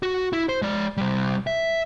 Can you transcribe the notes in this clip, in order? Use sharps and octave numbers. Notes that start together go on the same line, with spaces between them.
F#4
E4
C5
G#3 D5
C3 G3
E5